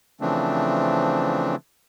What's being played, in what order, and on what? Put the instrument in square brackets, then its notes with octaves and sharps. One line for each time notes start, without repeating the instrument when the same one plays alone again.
[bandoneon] C#3 E3 F3 A3 C4 D4